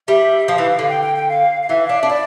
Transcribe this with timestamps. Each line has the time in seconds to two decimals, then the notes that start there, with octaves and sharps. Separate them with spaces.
0.08 G3 E5
0.47 F3 F5
0.58 E3
0.79 D3
0.89 G5
1.02 G5
1.16 G5
1.29 F5
1.63 F5
1.69 E3 E5
1.86 D4 F5
1.97 E5
2.03 D4
2.10 E4 D5